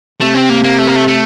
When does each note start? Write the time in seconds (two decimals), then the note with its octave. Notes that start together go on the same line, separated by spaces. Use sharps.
0.21 C3 A3
0.35 C4
0.50 A#3
0.64 A#3
0.78 A3
0.87 A#3
0.95 A3
1.07 A3